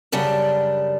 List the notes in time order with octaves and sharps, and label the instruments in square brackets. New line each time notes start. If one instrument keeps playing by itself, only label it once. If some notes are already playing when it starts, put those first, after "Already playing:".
[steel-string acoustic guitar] F#2 C#3 G3 D4